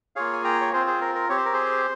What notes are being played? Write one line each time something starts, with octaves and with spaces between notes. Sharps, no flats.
A#3 F4 G#4 C#5 F5
G#5
G5 A#5
C#5
C4 F4 G#4 C5
G#4 C5
A#4
A#4
C4 G4 C#5
C5
A#4
G#4 C5